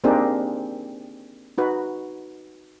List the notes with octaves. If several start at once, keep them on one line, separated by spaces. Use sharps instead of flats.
A#3 C4 D4 D#4 G4 G#4
D#4 F#4 B4